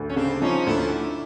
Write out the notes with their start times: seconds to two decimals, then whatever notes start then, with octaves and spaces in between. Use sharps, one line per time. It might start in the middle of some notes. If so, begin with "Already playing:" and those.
Already playing: D2
0.10 C#4
0.16 C#3 C4 D4
0.42 F3 C#4 D#4
0.67 D2 D4 E4